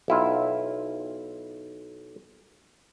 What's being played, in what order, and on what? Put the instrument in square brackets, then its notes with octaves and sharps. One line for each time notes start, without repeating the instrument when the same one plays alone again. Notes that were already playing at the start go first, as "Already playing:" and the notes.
[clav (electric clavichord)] B1 E4 F4